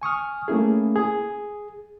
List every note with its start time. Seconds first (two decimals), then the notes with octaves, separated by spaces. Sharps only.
0.02 G#5 C#6 D#6 F6
0.48 A3 A#3 C#4 E4 G#4
0.96 G#4